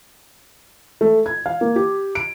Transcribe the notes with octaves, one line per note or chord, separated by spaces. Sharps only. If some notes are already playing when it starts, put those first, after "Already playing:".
A3
G#6
F5
A#3
G4
D7